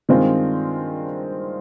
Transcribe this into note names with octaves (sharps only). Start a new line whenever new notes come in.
G2 D#3 G#3 C4 F4